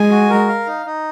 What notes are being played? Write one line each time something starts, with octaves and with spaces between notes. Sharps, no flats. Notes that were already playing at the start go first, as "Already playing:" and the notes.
Already playing: G#3 G#5
F#4
A#4
F5
D#4
D#4